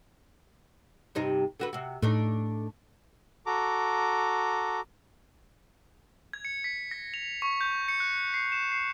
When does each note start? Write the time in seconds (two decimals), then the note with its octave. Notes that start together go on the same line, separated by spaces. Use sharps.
1.15 G2 C3 D#4
1.60 D3 F#4 B4
1.73 C3 F#4
2.02 A2 A3 D4 D#4
3.46 F#4 A4 A#5 D6
6.33 G#6
6.45 C#7
6.64 B6
6.91 A#6
7.14 F7
7.42 C#6
7.61 G6
7.88 C#7
8.00 F#6
8.34 C7
8.52 E7
8.71 C7